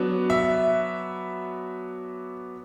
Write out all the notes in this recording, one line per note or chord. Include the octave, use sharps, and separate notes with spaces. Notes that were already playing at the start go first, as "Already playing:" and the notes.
Already playing: F#3 B3 D4
E5